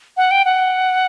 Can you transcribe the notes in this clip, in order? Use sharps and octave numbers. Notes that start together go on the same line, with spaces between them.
F#5
G5
F#5